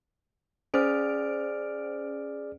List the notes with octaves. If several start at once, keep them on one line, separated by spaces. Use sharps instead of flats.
C#4 G#4 C5 D5 F6 D7